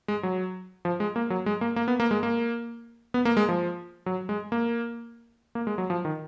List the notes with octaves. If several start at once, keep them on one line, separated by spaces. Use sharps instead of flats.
G#3
F#3
F3
G#3
A#3
F#3
G#3
A#3
A#3
B3
A#3
G#3
A#3
B3
A#3
G#3
F3
F#3
G#3
A#3
A#3
G#3
F#3
F3
D#3